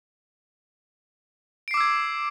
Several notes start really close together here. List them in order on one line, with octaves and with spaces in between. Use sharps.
D7 C7 D6 E6 G#6